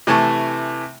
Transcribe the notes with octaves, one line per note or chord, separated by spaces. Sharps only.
C3 E3 A3 G#5 A5 C#6